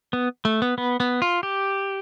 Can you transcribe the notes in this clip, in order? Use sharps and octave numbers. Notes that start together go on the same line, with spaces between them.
B3
A3
B3
B3
B3
F4
G4